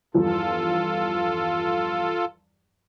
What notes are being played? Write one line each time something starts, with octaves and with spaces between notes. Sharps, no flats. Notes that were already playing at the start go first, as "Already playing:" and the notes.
E2 G2 F3 F4 A4